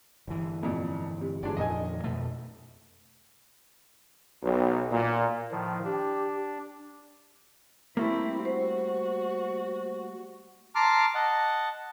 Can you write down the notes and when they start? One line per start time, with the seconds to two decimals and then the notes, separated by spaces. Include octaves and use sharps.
0.27 G1 E3
0.63 F2 A#2
1.21 C3
1.43 G1 G#3 D4 D5
1.57 F2 A#2 D#3 D#5 G#5
2.04 F2 B2 A3
4.43 B1
4.91 A#2
5.51 A2 D#3 F3
5.85 D4 G4
7.97 G3 A3 A#3 C4 E4
8.45 F#4 C5
10.75 A5 A#5 C6 D6 F6
11.15 D#5 F#5 A5